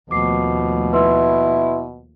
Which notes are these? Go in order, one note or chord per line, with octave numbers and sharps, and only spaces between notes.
D#2 B2 F3 A3 D6 C7
E4 B4 C6 E6